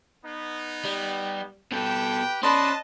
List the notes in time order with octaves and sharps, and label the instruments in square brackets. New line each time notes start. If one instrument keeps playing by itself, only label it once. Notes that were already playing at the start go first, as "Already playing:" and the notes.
[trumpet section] B3 D#4
[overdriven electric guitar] G3
[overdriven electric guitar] B2 A4 [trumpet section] G4 B4 G5
[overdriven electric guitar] C#4 D5 [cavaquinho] B4 C6 [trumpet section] D#5 A5